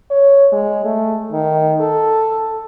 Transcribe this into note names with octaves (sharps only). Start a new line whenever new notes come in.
C#5
G#3
A3
D#3
A4